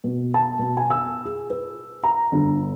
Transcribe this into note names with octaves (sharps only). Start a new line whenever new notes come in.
B2
A5
B2
G#5
E6
G#4
B4
A#5
G1